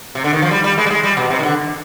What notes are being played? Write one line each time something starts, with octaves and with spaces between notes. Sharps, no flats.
C3
D3
D#3
F3
G3
G3
G#3
G3
G#3
G3
B2
C3
D#3
D3